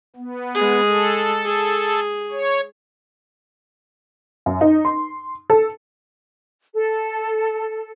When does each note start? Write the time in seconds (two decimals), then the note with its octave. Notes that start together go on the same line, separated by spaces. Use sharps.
0.16 B3
0.55 G#3 G#4
0.87 A4
1.45 G#4
2.31 C#5
4.46 F#2
4.61 D#4
4.85 C6
5.50 A4
6.74 A4